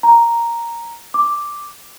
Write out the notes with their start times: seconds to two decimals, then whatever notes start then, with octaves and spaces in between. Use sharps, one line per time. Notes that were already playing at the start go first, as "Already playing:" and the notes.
0.03 A#5
1.14 D6